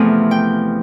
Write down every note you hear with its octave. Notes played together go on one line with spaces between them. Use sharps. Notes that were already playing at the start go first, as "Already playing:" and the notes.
Already playing: E2 C3 F3 A3 G#5
G5